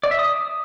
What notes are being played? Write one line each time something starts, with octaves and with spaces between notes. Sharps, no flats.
D5
E5
D#6